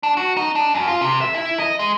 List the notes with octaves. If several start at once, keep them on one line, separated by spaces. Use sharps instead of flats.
D4
F#4
D#4
D4
F#2
F4
C3
E5
E4
D#5
G#3